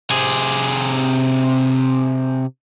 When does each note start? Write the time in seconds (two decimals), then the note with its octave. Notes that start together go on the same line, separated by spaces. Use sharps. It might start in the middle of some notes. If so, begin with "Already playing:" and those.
0.12 C3 G#4